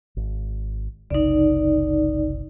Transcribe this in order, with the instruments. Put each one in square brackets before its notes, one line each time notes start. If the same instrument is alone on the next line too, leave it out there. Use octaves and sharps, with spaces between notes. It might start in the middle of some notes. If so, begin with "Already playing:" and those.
[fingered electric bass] G#1
[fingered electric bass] F#1 C2 C#3 [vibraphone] D#4 D5